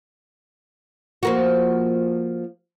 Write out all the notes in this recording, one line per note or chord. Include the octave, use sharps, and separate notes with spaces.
F3 A#3 F#4